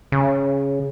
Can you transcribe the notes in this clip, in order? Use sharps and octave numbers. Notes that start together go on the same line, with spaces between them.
C#3